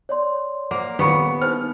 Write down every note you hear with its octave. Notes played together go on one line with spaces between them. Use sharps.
C#5 D5 C6
A#3 C5 F#5
D#1 B3 D4 B5 C#6 C#7
D4 D#4 C5 F6